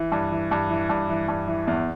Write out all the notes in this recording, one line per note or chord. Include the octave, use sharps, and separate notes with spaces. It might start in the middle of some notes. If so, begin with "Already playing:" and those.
Already playing: E3
G2
E3
G2
E3
G2
E3
G2
E3
E2